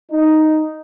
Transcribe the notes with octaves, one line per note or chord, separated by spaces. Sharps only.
D#4